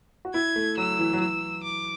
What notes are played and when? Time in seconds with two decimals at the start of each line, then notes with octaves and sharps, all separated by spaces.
0.25 F#4
0.34 E4 G#6
0.56 A3
0.77 F#3 E6
0.99 E3
1.13 F#3
1.20 E3 E6
1.64 D6